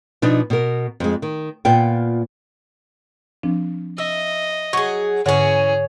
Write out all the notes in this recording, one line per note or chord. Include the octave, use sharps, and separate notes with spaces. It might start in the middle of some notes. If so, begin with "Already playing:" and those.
B2 F3 D4 D#4
B2 A#4
F2 G#3
D#3
A#2 B3 F4 G5
F3 C4 D4
D#5 E5
F#3 G#4 C#6
G#2 D3 E3 C#4 G#4 C#5 F#5